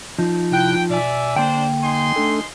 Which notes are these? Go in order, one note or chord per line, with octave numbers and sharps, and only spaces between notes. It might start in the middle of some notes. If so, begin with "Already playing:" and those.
F3 D#4
C3 E4 G5 F#6
B2 D5 E5 G#5
D3 A#3 D4 C5 G5
D#4 G#5 C6
A3 D4 A4